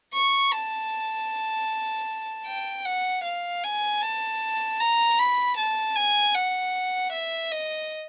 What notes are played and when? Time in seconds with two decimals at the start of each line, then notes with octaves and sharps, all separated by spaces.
0.13 C#6
0.52 A5
2.46 G5
2.85 F#5
3.24 F5
3.63 G#5
4.02 A5
4.80 A#5
5.19 B5
5.57 A5
5.96 G#5
6.35 F#5
7.12 E5
7.51 D#5